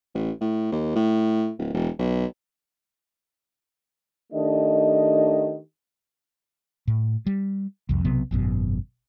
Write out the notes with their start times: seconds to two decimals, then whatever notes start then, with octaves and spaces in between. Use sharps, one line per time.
0.14 A1
0.41 A2
0.72 D#2
0.96 A2
1.59 D1
1.74 E1
1.99 B1
4.33 D#3 A3 D4 G4 D#5
6.88 A2
7.26 G3
7.89 C2 F2
8.05 B1 C3 F#3 B3
8.31 G#1 F#2 B2